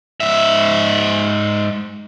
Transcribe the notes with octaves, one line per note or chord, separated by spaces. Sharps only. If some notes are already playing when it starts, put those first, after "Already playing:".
G#2 E5